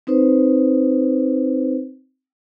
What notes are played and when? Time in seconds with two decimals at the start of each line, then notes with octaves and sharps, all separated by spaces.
0.07 C4 D#4 B4 C5